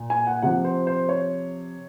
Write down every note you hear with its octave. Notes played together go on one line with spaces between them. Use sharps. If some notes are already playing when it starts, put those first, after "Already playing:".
Already playing: A#2
G#5
F#5
C3 F3 F#5
C5
C5
C#5